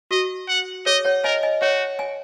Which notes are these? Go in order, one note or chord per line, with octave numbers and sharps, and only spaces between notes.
F#4 D#5
F#5
G#4 C#5 D#5
C#5 F#5
A#4 D#5 G#5
D#5 G#5
F#4 C#5 F#5
G#5